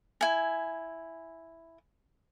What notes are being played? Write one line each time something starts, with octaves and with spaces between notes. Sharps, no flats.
E4 G#5